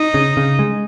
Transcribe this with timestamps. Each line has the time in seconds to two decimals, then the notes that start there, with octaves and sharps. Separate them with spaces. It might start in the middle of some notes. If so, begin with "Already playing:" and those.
Already playing: D#4
0.14 C#3
0.37 C#3
0.59 G#3